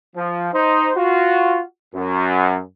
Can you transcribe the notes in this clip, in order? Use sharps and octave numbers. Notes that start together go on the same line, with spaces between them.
F3
D#4 C5
F4 F#4
F#2